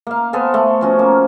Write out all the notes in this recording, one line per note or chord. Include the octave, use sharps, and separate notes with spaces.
A#3 F5
B3 A4 C5 G#5
A3
F3 C#4 F#4
A#3